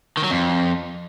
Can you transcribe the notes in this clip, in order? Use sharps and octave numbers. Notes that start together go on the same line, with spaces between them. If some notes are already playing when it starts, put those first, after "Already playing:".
D#3
F#3
F2